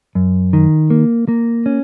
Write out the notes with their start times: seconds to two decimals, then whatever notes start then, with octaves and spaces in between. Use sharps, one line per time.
0.15 F#2
0.53 D#3
0.90 A#3
1.28 A#3
1.66 C#4